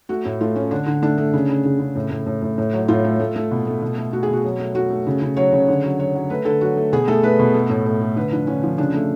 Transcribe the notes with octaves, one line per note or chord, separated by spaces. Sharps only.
A3 F#4
A2
A3 F4
A3 C#4
D3 D4
D3
A3 D4
A3
C#3
C#3
C#3
C#3
A2
A2
A2
A2
A2
F#3
A2 F4
A3
A3
A3
B2
A3
B2
A3
A3 F#4
G#4
B2 F#4
F#3
A3
A3 F#4
A3
C#3
C#3
F#3 C#5
C#3
D3
F#3
F#3 C#5
F#3
A3 B4
D3 A4
F#3 F#4
A3
B2 G#4
A3 A4
A3 B4
B2
A3
A2
A2
A3
D3 B4
F3 D4
D3 C#4
F3
C#3 D4
A3